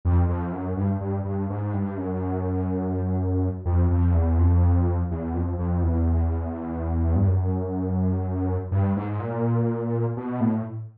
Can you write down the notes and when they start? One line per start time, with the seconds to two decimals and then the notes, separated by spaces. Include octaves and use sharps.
0.05 F2
0.29 F2
0.52 F#2
0.77 G2
1.01 G2
1.25 G2
1.50 G#2
1.73 G2
1.97 F#2
3.65 F2
3.90 F2
4.14 E2
4.38 F2
5.11 E2
5.34 F2
5.59 F2
5.83 E2
7.16 G2
7.27 F#2
8.71 G2
8.96 G#2
9.20 A#2
10.17 B2
10.40 A2